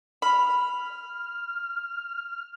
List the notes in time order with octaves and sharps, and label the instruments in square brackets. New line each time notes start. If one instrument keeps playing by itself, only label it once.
[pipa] B5 [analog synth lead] F6